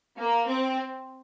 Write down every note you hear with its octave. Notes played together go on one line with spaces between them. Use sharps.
A#3
C4